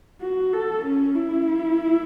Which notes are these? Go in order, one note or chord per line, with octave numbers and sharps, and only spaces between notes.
F#4
A4
C#4
E4